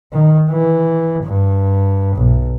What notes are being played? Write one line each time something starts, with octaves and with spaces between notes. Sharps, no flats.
D#3
E3
G2
B1